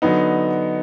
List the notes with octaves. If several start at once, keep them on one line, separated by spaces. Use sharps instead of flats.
D3 F#3 B3 D#4